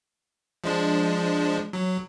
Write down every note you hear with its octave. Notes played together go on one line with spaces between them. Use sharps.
F3 G#3 D4
F#3